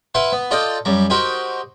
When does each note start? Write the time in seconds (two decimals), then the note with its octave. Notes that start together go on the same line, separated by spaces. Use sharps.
0.15 E4 B4 F5 F#5 C6
0.32 B3
0.51 F4 A4 D5 D#5 F5 G5
0.85 F#2 G3 A#5
1.10 D#4 F#4 G4 A#4 C5 G5